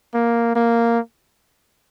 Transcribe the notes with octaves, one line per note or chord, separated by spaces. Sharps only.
A#3
A#3